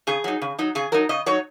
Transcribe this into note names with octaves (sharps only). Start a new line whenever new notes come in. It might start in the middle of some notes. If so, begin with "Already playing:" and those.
C#3 G#4
F#3 D#4
C#3
F#3 D#4
C#3 G#4
F#3 D#4 A#4
C#3 D#5
F#3 D#4 C#5